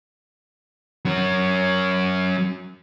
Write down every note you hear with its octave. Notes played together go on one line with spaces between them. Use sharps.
F#3 C#4